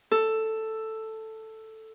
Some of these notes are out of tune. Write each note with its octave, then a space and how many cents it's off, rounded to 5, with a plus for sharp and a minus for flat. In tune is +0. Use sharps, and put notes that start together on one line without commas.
A4 +5